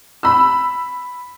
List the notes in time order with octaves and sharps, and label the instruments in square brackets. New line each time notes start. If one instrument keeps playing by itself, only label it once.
[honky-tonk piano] B5 E6